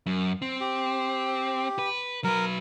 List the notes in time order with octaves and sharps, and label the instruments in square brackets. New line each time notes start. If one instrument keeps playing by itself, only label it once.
[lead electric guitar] F#2
C4
[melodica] G4
[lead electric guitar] B4
[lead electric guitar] F#3 B4 [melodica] A#4